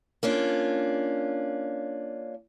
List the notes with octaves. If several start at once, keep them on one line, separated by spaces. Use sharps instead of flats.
A#3 C#4 D4 F4